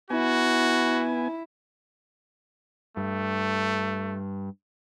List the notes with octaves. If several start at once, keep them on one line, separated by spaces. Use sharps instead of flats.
B3 E4 F#4 G#5
G2 A3